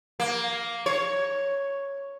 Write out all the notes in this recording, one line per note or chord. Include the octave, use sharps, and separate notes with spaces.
A#3
C#5